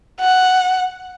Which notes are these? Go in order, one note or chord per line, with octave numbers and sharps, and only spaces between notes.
F#5